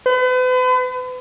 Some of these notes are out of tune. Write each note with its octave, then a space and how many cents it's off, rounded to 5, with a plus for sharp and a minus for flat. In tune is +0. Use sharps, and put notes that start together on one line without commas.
B4 +40